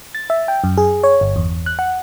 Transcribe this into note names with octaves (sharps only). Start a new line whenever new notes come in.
A6
E5
G5
F#2
G#4
C#5
G1
E2
F#6
F#5